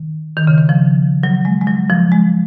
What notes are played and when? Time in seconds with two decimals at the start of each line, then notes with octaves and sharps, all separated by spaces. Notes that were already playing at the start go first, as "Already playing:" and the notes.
Already playing: D#3
0.37 D#3
0.47 C#3
0.58 D#3
0.69 F3
1.23 F#3
1.45 G#3
1.61 G#3
1.67 F#3
1.90 F3
2.12 G#3